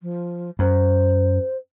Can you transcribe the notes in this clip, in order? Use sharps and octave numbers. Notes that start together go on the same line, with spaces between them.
F3
F#2 C5